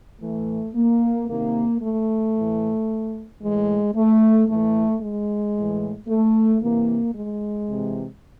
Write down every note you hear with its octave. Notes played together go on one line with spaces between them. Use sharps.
A2 E3 A3
A#3
C3 D#3 A#3
A3
A2 E3
A2 E3 G#3
A3
A2 E3 A3
G#3
A2 E3
A3
C3 E3 A#3
G#3
C3 E3